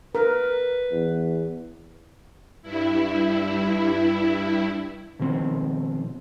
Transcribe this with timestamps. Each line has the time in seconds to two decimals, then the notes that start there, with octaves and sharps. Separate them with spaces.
0.15 A#4 B4
0.92 E2
2.62 G2 E4
5.19 B2 D#3 F3 C4